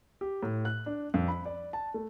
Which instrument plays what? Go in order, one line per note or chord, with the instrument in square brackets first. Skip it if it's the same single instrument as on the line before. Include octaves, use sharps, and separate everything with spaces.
[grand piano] G4
A2
F#6
D4
F2
B5
D5
A5
A3